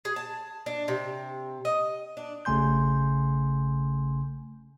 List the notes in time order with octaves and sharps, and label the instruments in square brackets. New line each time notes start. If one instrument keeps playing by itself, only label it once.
[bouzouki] G#4
A5
D4
C3
D#5
D4
[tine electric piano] A1 C#3 A3 G#5 C6 G6